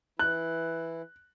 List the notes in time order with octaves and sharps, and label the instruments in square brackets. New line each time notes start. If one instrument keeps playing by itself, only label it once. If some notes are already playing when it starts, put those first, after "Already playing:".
[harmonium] E3 E4 [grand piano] F#6